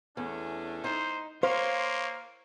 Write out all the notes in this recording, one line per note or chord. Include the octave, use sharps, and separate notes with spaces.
E2 A3 C#4 D4
D#4 C5
A#3 C5 C#5 F5 C6